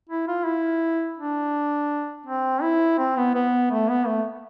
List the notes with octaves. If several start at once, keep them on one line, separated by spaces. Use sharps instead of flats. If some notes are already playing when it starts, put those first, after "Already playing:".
E4
F4
E4
D4
C4
E4
C4
B3
B3
A3
B3
A3